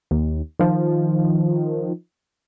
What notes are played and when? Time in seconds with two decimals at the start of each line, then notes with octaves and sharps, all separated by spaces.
0.11 D#2
0.59 D#3 F3